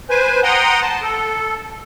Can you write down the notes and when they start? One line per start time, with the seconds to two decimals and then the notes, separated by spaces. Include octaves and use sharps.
0.10 B4 C5 G#5
0.43 F#5 G5 A#5 C6 D#6
0.82 A5
1.02 A4